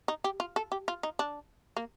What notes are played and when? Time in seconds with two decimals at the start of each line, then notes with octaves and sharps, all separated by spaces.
0.08 D#4
0.24 G4
0.40 F4
0.56 A4
0.72 G4
0.88 F4
1.03 D#4
1.19 D4
1.77 A#3